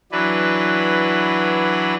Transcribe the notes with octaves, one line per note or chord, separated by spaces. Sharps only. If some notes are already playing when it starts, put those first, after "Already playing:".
E3 F#3 D4 B4